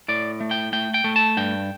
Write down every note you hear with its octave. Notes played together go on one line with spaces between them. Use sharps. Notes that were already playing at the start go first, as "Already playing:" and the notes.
A2 D5
A3
G5
A3 G5
G5
A3
A5
G2 G5